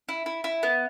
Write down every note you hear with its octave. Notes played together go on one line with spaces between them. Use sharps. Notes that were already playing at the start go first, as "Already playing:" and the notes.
E4
E4
E4
B3